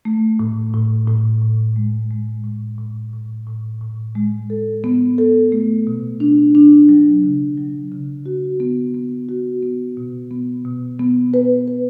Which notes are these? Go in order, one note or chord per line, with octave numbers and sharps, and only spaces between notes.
A3
A2
A2
A2
A2
G#3
G#3
A2
A2
A2
A2
A2
G#3
A4
B3
A4
A3
B2
D4
D4
F#3
C#3
F#3
C#3
F#4
B3
B3
F#4
B3
B2
B3
B2
B3
B4
B4